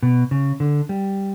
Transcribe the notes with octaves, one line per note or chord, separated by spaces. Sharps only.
B2
C#3
D3
G3